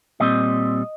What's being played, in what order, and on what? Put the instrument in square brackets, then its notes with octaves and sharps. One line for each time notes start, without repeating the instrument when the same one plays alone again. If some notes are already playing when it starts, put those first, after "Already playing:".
[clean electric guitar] A#2 G3 C4 D#5